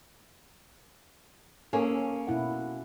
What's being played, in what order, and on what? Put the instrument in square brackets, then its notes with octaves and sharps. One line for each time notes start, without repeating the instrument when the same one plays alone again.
[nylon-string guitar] A#3 C#4 G#4 [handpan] A4
[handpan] B2 E4 F#5